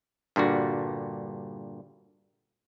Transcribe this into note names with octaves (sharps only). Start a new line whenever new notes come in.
G2 A#2 D3 F#4